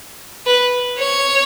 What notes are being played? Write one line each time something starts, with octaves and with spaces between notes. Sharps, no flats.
B4
C#5